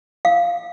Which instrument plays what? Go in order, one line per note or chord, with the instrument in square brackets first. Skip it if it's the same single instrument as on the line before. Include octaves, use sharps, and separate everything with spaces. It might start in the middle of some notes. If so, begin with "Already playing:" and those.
[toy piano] F5